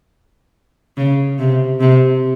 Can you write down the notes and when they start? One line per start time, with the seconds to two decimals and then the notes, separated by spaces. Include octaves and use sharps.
0.97 C#3
1.38 C3
1.80 C3